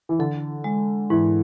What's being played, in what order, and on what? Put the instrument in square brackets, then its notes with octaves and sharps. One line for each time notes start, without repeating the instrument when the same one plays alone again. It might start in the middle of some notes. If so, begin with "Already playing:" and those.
[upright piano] E3
[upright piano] D3 [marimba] A4
[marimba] G#3
[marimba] G#2 [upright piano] E3